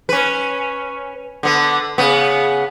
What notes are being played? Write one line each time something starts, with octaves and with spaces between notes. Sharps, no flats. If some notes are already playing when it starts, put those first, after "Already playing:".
C#4 B4
D3 B3
C#3 B3